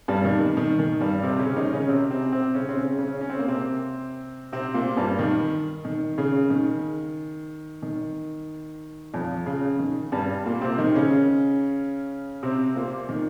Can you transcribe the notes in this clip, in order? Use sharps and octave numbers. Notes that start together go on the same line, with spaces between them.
G2 G3
D#3
D#3
D#3
D#3
G2 G3
C3 C4
C#3 C#4
D#3 D#4
C#3 C#4
C3 C4
C3 C4
C3 C4
C#3 C#4
C4
C#3 C#4
C#3 C#4
C#4
C4
A#3
C3 C4
C3 C4
A#2 A#3
G2 G3
D#3
D#3
C#3
D#3
D#3
F2 F3
C#3
D#3
G2 G3
A#2 A#3
C3 C4
D#3 D#4
C#3 C#4
C3 C4
A#2 A#3
D#3